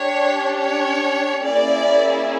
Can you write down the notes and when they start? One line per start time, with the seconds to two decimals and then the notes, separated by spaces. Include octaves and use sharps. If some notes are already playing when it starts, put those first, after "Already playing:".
Already playing: D4 G4 C#5
0.57 C#5
1.43 A#3 C#4 E4 G#4 D5